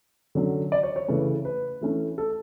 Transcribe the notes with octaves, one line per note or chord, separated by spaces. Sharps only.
D3 F#3 C#4
D5
C#5
C#5
C#3 E3 A3 C#4 B4
B4
E3 A3 C#4
A4